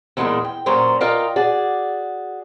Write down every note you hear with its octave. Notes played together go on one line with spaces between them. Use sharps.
E2 A#2 G#3 G4 D#5 E5
G5
A#2 F#3 C#4 C5 D5
F4 A#4 D5 D#5 F5 G5
F#4 G#4 D5